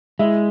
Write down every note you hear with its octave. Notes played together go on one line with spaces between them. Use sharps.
G#3 E4 E5